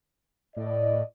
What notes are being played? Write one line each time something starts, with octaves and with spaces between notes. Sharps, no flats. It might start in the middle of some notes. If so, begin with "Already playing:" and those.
A2 D5 D#5